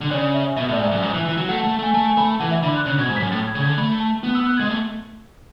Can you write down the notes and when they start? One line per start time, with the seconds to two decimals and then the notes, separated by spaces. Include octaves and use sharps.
0.01 D3
0.11 C#3 D5
0.34 E5
0.57 B2 E5
0.68 A2 D5
0.80 G#2
0.87 E5
0.91 F#2
1.02 G#2 E5
1.14 E3
1.25 E3
1.37 F#3
1.49 A3 F#5
1.60 A5
1.64 A3
1.79 A3 G#5
1.94 A3 A5
2.06 G#5
2.17 A3 B5
2.29 A5
2.40 E3 F#5
2.51 E5
2.63 D3 B5
2.75 F#6
2.86 C#3 F#6
2.97 B2 G#6
3.09 G#2
3.16 B6
3.20 F#2
3.31 A2 A6
3.47 G#6
3.55 C#3
3.62 G#6
3.66 D3
3.77 A3 B5
4.00 A5
4.24 B3
4.35 E6
4.47 F#6
4.58 G#6
4.60 G#3
4.69 A3